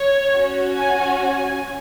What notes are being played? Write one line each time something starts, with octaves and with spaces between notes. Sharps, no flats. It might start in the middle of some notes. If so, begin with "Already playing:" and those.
Already playing: C#5
C#4 F#4
G#5
G#5